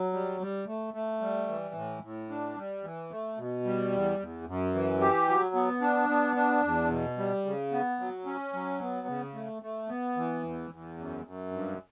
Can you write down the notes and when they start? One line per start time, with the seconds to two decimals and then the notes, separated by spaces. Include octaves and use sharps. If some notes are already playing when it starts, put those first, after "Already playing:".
Already playing: F#3
0.13 G3
0.40 G3
0.67 A3
0.94 A3
1.21 G3
1.48 E3
1.75 A2
2.03 A2
2.30 D4
2.57 G3
2.84 E3
3.11 A3
3.37 B2
3.65 G3
3.92 E2
4.19 E2
4.47 F#2
4.74 E3
5.00 G4
5.28 F#3
5.55 B3
5.82 D4
6.09 B3
6.36 D4
6.64 E2
6.90 B2
7.17 G3
7.45 C#3
7.72 B3
8.00 F#3
8.26 C#4
8.54 F#3
8.81 B3
9.08 C#3
9.34 A3
9.62 A3
9.89 B3
10.17 E3
10.43 E2
10.71 E2
10.98 F#2
11.25 F#2
11.51 G2